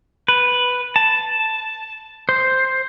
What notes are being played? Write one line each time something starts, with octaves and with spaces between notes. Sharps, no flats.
B4
A5
C5